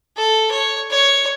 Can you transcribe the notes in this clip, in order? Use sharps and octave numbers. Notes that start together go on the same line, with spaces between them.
A4
C#5
C#5